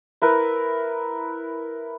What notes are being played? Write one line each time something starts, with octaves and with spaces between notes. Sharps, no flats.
E4 A#4 B4